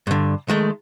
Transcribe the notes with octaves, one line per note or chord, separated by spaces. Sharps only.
G2 D3
D#3 G#3 A3